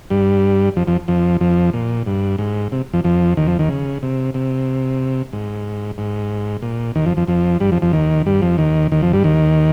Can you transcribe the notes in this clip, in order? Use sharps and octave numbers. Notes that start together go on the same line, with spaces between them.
G2 G3
F2 F3
F2 F3
F2 F3
F2 F3
A#2
G2
G#2
C3
F2 F3
F2 F3
D#2 D#3
F2 F3
D#2 D#3
C#3
C3
C3
G#2
G#2
A#2
D#2 D#3
F2 F3
F2 F3
F2 F3
G2 G3
F2 F3
F2 F3
D#2 D#3
G2 G3
F2 F3
D#2 D#3
D#2 D#3
F2 F3
G2 G3
D#2 D#3